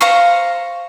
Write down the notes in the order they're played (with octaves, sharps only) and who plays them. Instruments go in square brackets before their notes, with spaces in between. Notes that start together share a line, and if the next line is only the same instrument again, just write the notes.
[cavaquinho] C5 F5 A#5 C#6